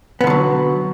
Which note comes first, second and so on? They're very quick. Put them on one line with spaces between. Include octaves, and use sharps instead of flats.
B3 D3 F3 F#3